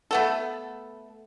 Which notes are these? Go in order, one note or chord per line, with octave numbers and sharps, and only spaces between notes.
A3 B3 A4